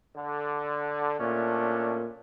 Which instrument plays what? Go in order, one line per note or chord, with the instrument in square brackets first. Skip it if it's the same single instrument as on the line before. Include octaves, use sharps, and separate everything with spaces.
[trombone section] D3
[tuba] A#2 [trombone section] A3 C#4 D4